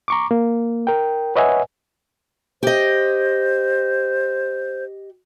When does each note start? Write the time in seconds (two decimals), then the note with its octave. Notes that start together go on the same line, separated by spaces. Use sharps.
0.08 A#5 C#6 D6
0.31 A#3
0.87 A#4 G5
1.36 B4 C#5 D#5 E5 F#5 G#5
2.63 G4 C5 D#5